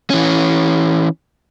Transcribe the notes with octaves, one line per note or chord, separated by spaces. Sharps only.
E3 C#4